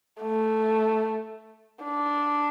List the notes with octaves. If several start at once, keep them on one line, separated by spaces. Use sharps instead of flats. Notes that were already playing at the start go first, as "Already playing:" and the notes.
A3
D4